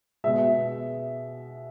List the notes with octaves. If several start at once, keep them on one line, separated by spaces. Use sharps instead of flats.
B2 G#3 E5